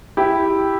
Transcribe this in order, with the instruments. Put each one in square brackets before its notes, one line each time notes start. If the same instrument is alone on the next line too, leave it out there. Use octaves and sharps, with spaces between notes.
[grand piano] E4 G4